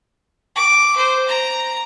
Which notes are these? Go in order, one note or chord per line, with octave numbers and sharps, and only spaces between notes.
D6
C5
A#5